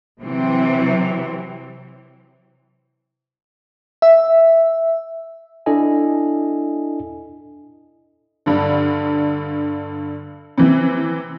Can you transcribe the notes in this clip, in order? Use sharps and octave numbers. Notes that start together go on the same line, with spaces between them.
C3 E3 F#3 C4
E5
D4 E4 A4 D#5 G#5
G2 D3
C3 E3